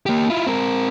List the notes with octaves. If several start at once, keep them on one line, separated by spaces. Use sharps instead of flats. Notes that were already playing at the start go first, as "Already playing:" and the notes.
A#3 G4
E4 F4
C4 A#4